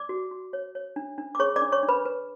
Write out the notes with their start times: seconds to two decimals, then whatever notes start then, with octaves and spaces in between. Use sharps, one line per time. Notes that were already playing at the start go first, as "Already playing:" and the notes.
Already playing: D5 D6
0.09 F#4
0.31 F#4
0.53 C#5
0.75 C#5
0.96 D4
1.18 D4
1.35 D6
1.40 G#4 C#5 C#6
1.56 D5 D6
1.62 D4
1.72 C#5 C#6
1.83 D4
1.88 B4 B5
2.05 B4